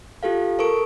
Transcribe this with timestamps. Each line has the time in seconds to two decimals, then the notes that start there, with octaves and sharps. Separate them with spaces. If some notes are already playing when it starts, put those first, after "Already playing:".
0.23 F4 G4 A4 F5
0.59 A4 A#4 C#6 D7